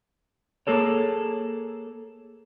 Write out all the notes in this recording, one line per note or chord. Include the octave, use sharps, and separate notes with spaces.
A#3 G#4 A4 C#5